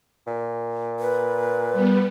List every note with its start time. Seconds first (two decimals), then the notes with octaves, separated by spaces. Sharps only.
0.27 A#2
0.99 B4
1.73 G3 B3